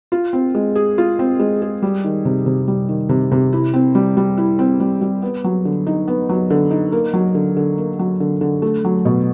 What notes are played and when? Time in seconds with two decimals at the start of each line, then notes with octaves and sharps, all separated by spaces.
0.12 F4
0.33 C4
0.55 G#3
0.75 G#4
0.98 F4
1.19 C4
1.39 G#3
1.62 G#4
1.82 G3
2.04 D#3
2.25 C3
2.46 C3
2.68 G3
2.89 D#3
3.09 C3
3.32 C3
3.53 E4
3.74 C4
3.95 G3
4.17 G3
4.37 E4
4.59 C4
4.80 G3
5.01 G3
5.22 B3
5.44 F#3
5.65 D3
5.87 D#4
6.08 B3
6.29 F#3
6.50 D3
6.71 D#4
6.92 A#3
7.14 F#3
7.35 D3
7.57 D3
7.78 A#3
7.99 F#3
8.20 D3
8.41 D3
8.62 A3
8.85 F#3
9.05 B2